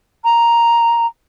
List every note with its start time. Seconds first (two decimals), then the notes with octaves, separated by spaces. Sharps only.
0.24 A#5